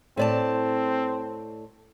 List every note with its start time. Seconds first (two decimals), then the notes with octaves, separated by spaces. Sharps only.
0.17 A2 C4 D5 A5